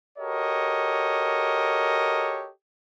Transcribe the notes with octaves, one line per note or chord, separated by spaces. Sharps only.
F#4 G4 A4 A#4 C#5 D#5